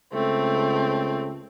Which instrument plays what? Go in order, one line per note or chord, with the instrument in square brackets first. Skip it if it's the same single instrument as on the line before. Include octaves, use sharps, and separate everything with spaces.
[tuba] C#2 [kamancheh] A3 C4